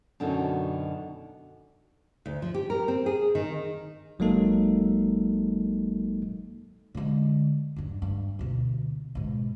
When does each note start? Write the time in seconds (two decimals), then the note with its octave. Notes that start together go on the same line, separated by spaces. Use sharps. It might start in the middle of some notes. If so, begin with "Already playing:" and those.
0.20 F#2 B2 D3 D#3 B3 D#4
2.26 D2
2.42 F3
2.54 G4
2.70 A#4
2.88 C4
3.06 G#4
3.35 D#3
4.19 G1 F#3 G#3 A#3 D#4 A4
6.95 D3 G#3
7.76 E2 G2
8.02 G2
8.39 D2 B2
9.15 G#2 B2